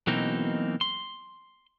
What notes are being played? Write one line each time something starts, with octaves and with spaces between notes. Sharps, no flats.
B1 B2 E3 A#3 C4 D#4
C6